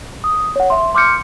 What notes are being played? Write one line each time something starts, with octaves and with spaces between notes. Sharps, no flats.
D#6
C#5 F#5
E5 C6
C6 D6 F6 G6 C#7